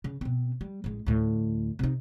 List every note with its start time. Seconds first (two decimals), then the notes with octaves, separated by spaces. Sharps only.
0.04 C#3
0.21 B2 C4
0.61 G3
0.84 A1 G#3
1.06 D2 A2
1.79 C3 D#4